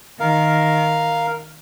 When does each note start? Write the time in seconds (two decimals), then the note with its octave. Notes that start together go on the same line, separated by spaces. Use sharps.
0.20 D#3 A#4 F5